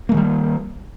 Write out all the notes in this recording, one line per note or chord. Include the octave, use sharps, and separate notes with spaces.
D#3 G3 G#3 A#3